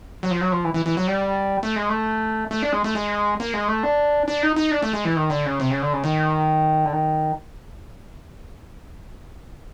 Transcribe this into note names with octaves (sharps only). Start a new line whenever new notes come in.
F#3
F3
F#3
F3
E3
E3
E3
F#3
G3
A3
G#3
A3
A3
D4
G#3
A3
G#3
A#3
G#3
A3
D4
D4
D#4
D#4
D4
A3
G#3
E3
D#3
D3
C#3
C3
C#3
D3
C#3
D#3
D3
D#3